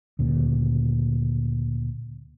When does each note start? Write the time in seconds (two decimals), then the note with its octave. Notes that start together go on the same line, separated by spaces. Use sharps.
0.19 D2 A#2 C#3